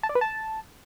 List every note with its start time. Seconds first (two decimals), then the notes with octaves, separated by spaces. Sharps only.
0.03 A5
0.09 D5
0.15 B4
0.21 A5